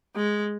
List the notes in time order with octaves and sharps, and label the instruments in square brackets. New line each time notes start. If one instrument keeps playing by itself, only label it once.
[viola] G#3